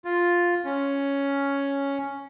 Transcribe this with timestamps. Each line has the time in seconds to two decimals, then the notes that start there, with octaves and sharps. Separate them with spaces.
0.05 F4
0.65 C#4